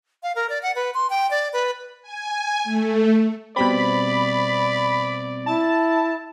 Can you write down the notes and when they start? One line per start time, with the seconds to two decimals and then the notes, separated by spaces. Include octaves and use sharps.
0.23 F5
0.36 A#4
0.49 D5
0.63 F#5
0.75 B4
0.94 C6
1.10 G5
1.31 D5
1.53 B4
2.02 G#5
2.64 A3
3.56 B2 G3 C4 D5 B5
5.46 E4 A5